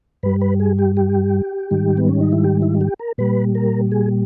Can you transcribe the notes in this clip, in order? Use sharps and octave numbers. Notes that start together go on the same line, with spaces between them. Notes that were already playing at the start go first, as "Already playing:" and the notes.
G2 G3 B4
B4
G#4
G4
G4
G#2 D#3 G3
B3
C#4
D#4
E4
G4
E4
G4
A#4
A#2 G3 B4
A#4
G#4